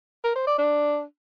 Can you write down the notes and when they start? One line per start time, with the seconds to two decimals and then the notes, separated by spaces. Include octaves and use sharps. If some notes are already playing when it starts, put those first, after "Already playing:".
0.24 A#4
0.35 C5
0.47 D5
0.58 D4